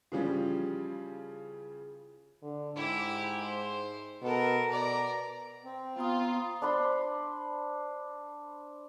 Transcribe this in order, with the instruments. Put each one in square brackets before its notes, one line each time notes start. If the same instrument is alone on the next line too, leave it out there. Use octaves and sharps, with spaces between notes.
[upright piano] C#3 E3 F3 G3 C#4
[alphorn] D3
[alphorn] G#2 [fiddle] E4 G4
[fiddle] C5
[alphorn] B2 [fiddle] A4 A#4
[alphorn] B2 [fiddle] D5 A#5
[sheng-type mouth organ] C4
[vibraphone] B3 A#5 D#6 [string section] F4
[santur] D4 C5 B5 C6